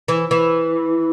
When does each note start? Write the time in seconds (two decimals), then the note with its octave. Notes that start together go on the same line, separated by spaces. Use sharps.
0.08 E3
0.31 E3